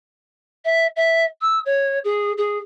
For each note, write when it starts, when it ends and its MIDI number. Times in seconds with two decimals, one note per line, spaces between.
0.65 0.87 76
0.96 1.25 76
1.41 1.59 88
1.66 1.99 73
2.04 2.33 68
2.38 2.58 68